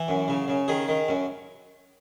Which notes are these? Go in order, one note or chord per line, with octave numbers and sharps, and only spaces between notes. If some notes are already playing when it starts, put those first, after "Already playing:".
Already playing: E3
F#2
C#3
C#3
D#3 G#4
D#3
F#2